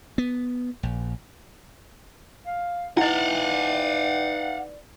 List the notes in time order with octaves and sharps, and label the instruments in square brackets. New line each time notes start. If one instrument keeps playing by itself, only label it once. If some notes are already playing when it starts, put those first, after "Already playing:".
[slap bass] B3
A#1
[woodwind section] F5
[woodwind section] D#4 B4 D5 [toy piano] E4 D#5 [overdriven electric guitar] F5 F#5